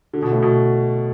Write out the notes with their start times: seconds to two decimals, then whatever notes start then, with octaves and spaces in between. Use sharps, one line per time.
0.13 D3
0.22 B2
0.32 A2
0.42 B2